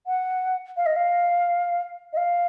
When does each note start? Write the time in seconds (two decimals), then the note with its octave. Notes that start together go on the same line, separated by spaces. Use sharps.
0.06 F#5
0.76 F5
0.86 D#5
0.96 F5
2.13 D#5
2.17 F5